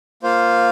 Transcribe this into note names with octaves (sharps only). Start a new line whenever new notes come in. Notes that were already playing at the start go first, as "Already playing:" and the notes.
A#3 F4 C5 F5